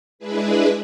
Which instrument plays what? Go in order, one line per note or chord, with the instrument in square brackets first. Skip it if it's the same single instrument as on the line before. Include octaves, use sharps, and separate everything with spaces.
[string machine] G#3 D4 E4 G#4 B4